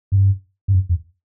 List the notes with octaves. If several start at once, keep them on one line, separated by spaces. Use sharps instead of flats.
G2
G2
F#2
F2